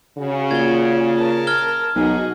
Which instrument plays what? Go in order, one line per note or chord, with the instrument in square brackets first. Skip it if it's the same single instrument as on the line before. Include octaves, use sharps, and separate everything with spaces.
[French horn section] C#3 [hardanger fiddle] F#4
[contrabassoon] A#2 [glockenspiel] G#6 G7
[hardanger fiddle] A#4 A5
[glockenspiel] F6 G#6 G7
[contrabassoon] B1 [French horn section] D#4 [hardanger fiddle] F#4 G#4